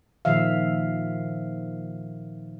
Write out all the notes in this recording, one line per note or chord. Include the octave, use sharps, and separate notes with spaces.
A#2 D#3 F3 E5 F5